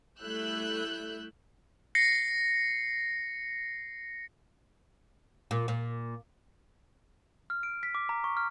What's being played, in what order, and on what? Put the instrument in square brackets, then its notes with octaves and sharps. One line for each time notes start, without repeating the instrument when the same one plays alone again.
[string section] G3 A3 E4 E6 F#6 G6
[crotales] A#6 C7 C#7
[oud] A#2
A#2
[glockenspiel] F6
D7
B6
D6
A#5
C#6
F6